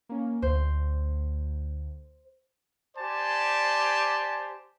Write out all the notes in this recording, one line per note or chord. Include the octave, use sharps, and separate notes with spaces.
A#3 C#4
D2 C5
G4 C5 D5 G#5 A5